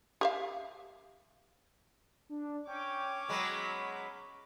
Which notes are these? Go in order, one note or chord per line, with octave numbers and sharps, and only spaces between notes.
G4 E5 F5
D4
C#4 C#5 G5 D6
F#3 G#3 B3 B5